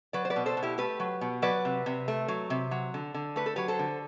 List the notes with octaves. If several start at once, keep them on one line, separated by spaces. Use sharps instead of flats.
F#3 B4 D5
C5
B4 D5
B2
A4 C5
B2
E4 G4
A3 G4 B4
F#3
B2
F#3 B4 D5
C3
C3
A3
F#3
C3
F#3
D3
D3
A3 B4
A4
F#3 G4 B4
A4 C5
D3